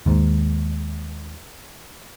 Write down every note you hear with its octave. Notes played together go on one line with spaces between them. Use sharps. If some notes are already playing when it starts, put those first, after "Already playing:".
D#2 G#2